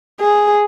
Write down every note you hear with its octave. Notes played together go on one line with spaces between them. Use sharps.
G#4